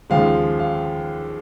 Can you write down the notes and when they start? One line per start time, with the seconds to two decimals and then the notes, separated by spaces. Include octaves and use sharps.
0.10 D#2 C#3 F3 G#3 F5
0.59 F5